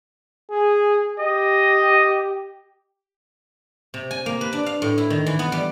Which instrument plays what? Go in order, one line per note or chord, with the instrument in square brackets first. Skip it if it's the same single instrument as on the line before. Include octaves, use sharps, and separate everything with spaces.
[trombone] G#4
[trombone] G4 [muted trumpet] D#5
[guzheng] C3
G#5
A#3
B4
D4
F5
A2
E4
D#3
E3
B3
G3